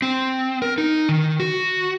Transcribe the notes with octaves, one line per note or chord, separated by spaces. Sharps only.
C4
A#4
D#4
D#3
F#4